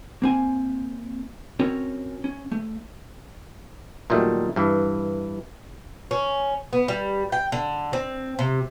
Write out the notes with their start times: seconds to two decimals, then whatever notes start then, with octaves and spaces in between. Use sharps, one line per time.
0.22 A#3 C4 G#5
1.59 C4 C#4 F#4 A#4 C#5
2.24 C#4
2.52 A3
4.10 A#2 D#3 F#3 G3 A3
4.56 G2 E3
6.11 C#4
6.73 B3
6.88 G3
7.32 G5
7.52 D3
7.93 C4
8.39 C3